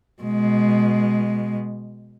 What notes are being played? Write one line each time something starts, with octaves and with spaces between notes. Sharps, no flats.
B2 G#3